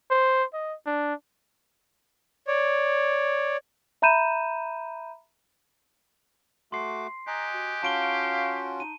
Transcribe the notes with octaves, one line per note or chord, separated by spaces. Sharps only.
C5
D#5
D4
C#5 D5
E5 A#5 B5 G6 D#7 E7
A3 F#4 C6 D6 C7
G4 D#5 G#5 A#5 F#6
F#4
C#4 F4 F#4 F5 A5 D7 G7
D#4 D#7